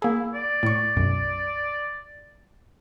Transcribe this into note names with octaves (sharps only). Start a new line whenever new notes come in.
A#3 E4 G#4
D5
A2 C#6
B1 F#2